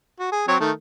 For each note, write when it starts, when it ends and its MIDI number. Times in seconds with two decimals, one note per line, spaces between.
0.20 0.29 66
0.32 0.47 68
0.48 0.56 54
0.48 0.56 60
0.48 0.56 73
0.60 0.71 51
0.60 0.71 57